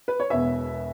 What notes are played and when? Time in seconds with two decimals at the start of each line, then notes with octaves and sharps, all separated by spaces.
0.08 B4
0.20 C#5
0.30 E1 E2 B2 B3 E5